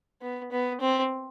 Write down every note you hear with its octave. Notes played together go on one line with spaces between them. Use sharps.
B3
B3
C4